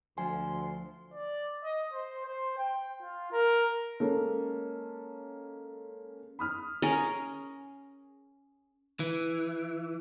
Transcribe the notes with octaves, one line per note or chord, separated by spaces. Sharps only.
D2 F3 G#5 C6
D5
D#5
C5
C5
G5
F4
A#4
G#3 A#3 C#4 A4
B5 D#6 F6
C#4 G#4 A#4
E3